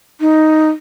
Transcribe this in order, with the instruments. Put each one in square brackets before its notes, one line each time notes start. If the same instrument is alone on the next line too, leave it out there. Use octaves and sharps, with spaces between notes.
[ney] D#4